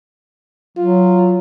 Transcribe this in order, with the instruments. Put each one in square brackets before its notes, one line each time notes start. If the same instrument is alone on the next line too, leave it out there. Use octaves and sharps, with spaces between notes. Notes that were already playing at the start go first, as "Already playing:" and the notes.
[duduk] F#3 [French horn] F4